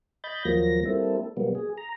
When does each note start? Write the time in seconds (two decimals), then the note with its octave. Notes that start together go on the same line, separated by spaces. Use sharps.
0.24 D#5 B5 G6 A6
0.45 D#2 F3 F#3 A#3 A#6
0.85 G3 A#3 C4 E4 A4
1.37 B2 F#3 G3 A#3 B3
1.55 G#4
1.78 A#5